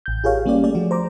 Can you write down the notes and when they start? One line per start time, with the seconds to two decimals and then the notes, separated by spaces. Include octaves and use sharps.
0.06 A1 G6
0.24 F4 G4 G#4 A#4 C#5 F5
0.46 G3 A#3 C#4 G4 D5
0.64 A3 G#4 D5
0.75 F3 F#4
0.91 C5 A#5 D6